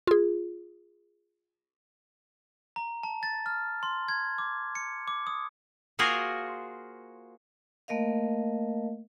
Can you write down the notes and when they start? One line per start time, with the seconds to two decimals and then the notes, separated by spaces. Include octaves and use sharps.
0.07 F4 G#4
2.76 A#5
3.03 A5
3.23 A6
3.46 F6
3.83 C6
4.08 G#6
4.38 D6
4.75 C#7
5.08 D6
5.27 D#6
5.99 A#3 F4 F#4 G#4 A#4 C5
7.88 A3 A#3 A#4 D#5 F5